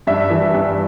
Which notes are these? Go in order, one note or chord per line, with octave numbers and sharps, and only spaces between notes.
G2 E5
E3
G2